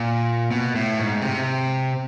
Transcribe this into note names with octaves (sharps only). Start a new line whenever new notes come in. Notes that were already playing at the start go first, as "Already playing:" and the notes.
Already playing: A#2
B2
A2
G#2
C3